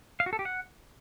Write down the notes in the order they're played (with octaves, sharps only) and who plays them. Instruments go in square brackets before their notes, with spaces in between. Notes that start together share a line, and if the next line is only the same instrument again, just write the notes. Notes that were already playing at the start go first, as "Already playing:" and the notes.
[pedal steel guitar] F5
F#4
A4
G4
F#5